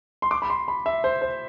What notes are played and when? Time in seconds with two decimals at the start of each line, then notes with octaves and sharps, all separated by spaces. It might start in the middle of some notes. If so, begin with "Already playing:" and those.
0.22 C6
0.31 D6
0.42 B5
0.50 C6
0.68 B5
0.86 E5
1.04 C5
1.22 C5